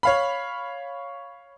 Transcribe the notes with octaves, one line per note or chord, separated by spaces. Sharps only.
C#5 F5 B5